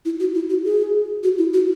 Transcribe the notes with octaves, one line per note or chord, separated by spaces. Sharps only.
E4
F#4
E4
F#4
G#4
F#4
E4
F#4